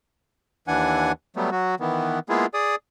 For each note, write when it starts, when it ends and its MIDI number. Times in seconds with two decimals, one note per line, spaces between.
0.68 1.12 39
0.68 1.12 52
0.68 1.12 62
0.68 1.12 78
0.68 1.12 80
1.36 1.50 54
1.36 1.50 55
1.36 1.50 57
1.36 1.50 59
1.52 1.75 54
1.52 1.75 66
1.80 2.19 51
1.80 2.19 52
1.80 2.19 59
2.29 2.46 56
2.29 2.46 58
2.29 2.46 59
2.29 2.46 64
2.29 2.46 65
2.29 2.46 68
2.54 2.75 68
2.54 2.75 74
2.54 2.75 87